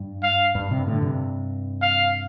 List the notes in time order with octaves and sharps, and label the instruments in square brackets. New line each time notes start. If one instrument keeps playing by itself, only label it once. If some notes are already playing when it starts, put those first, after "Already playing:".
Already playing: [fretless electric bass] G2
[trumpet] F5
[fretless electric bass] G2
G2 C3
A2 D3
G2 C3
[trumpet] F5